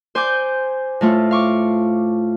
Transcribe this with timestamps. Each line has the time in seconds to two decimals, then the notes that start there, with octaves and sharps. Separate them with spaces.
0.15 C5 G#5 D6 G6
1.01 A2 A3 F4
1.31 F5 C#6 D6